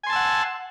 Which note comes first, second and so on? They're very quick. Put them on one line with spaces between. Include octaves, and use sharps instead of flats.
G#5 C6 A5 E6 F#5